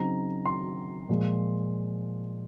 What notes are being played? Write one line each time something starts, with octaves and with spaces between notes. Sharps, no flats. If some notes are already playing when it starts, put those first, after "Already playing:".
Already playing: C#3 F#3 C4 D#4 A#5
C6
A#2 F3 G#3